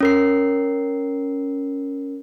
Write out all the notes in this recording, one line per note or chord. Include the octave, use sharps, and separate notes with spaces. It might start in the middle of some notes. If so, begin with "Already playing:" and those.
C#4 A#4 C7